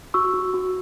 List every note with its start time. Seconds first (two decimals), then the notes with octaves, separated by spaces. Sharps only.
0.14 F#4 C#6 E6
0.34 F#4
0.54 F#4